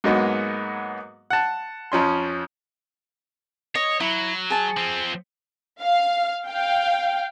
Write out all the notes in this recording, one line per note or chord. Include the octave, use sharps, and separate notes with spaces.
G#2 F#3 G#3 A#3 B3
F#5 A5
F2 F3 C#4 C6
C#5 D#5
F#3 E4
G#4 A5
F3 C4
F5
F5 G5